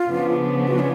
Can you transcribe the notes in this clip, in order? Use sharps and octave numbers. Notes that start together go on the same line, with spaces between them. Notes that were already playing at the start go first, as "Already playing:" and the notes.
Already playing: F4
C#3 F3 B3 D4
F#4
C#4